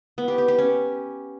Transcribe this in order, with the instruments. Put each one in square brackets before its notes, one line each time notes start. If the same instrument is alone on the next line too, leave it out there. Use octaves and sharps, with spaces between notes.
[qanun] B3
G4
G4
G4
C#4